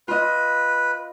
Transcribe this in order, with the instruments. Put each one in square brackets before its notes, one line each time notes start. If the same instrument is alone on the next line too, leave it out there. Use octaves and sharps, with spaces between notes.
[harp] F4 D#5 [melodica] B4